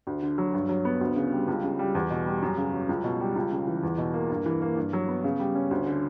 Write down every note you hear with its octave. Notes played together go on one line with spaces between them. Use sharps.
D2
D3
F#3
G2
F#3
B3
D2
C#3
G3
C#2
C#3
G3
E2
B2
G3
F#2
C#3
F#3
C#2
B2
G3
C#2
C#3
E3
E2
B2
A#3
G2
E3
A#3
G2
F#3
B3
C#3
G3
C#4
D2
D3